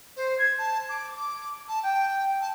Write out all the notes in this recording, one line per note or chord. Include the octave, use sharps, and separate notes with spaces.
C5
G#6
A5
D6
D6
A5
G5
A5